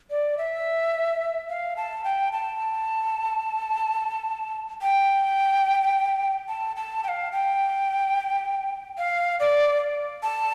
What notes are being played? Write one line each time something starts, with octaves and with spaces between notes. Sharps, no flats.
D5
E5
F5
A5
G5
A5
G5
A5
A5
G5
F5
G5
F5
D5
A5